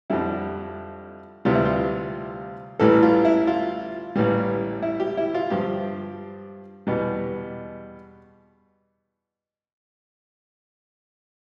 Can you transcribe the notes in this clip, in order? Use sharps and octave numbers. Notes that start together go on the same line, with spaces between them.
F2 D3 G3 E4
D2 C3 E3 G3 F4
E4
F4
A1 A2 E3 G3 A4
F4
E4
F4
A1 A2 E3 G3
E4
G4
E4
F4
G2 F3 G4
E2 B2 G3